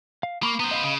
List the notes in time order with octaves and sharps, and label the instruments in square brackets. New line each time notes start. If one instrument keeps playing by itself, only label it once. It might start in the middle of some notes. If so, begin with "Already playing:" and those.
[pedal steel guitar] F5
[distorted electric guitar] A#3 [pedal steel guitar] B5 C#6 D6
[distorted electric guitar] B3 C5 [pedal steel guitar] A#5
[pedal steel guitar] D#5 F5 B5
[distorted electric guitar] C#3